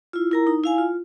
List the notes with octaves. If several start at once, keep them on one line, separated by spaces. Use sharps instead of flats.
E4 F4
E4 A#4 A#5
D#4
E4 F5 G#5
F4